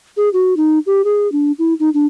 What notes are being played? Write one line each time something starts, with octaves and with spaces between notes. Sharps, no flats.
G#4
F#4
D#4
G4
G#4
D4
E4
D#4
D4